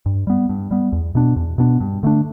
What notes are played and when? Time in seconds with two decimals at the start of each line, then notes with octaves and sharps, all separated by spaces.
0.06 G2
0.27 G3 B3
0.49 G2
0.71 G3 B3
0.92 E2
1.15 B2 B3 D4
1.36 E2
1.58 B2 B3 D4
1.80 G2
2.03 D3 A3 D4